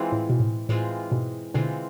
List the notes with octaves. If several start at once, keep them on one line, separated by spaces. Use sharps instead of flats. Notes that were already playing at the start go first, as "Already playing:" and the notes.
Already playing: E3 G#3 C4 F4
A2
B2
A2
A2 E3 G#3 C4 F4
G#2 B2
B2 D3 E3 G#3 C4 F4